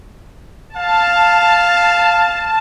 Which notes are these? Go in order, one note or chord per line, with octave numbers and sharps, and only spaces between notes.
F5 A5